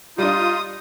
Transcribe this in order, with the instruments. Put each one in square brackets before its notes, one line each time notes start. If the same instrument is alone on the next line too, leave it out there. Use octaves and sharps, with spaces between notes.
[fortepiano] G3 D4 [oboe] D#4 [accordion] F4 [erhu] D#6